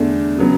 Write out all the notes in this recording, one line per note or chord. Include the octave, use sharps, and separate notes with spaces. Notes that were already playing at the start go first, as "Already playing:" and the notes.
Already playing: E2 D3 A3 D4
C#3 F#3 B3